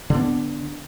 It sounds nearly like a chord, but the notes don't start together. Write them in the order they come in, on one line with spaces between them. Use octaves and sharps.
D3 D4 B3